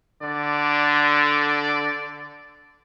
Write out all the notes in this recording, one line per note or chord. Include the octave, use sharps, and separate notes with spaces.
D3 D5